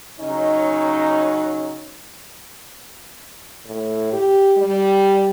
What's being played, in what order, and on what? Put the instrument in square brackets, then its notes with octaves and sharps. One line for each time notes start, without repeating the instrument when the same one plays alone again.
[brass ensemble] C#3 F#3 C#4 D#4
[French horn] A2
G4
G3